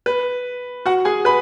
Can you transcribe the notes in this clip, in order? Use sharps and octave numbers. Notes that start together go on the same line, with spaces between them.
B4
F#4 F#5
G#4 G#5
B4 B5